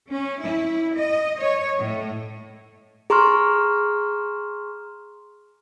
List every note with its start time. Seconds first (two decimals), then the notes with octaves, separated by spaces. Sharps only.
0.10 C#4
0.41 E4
0.95 D#5
1.40 C#5
1.78 A2
3.10 G#4 A#5 C6 C#6 F6